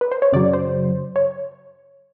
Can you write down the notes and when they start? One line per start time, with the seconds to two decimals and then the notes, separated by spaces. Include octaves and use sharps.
0.01 B4
0.12 C5
0.22 C#5
0.32 F#2 C#3 F#3 D5
0.53 C5
1.16 C#5